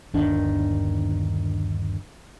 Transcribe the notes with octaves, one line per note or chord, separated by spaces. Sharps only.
G1 D#2 D#3 D4